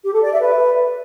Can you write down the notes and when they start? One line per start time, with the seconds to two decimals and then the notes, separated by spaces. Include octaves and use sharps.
0.03 G4
0.13 A4
0.22 D5
0.32 E5
0.41 B4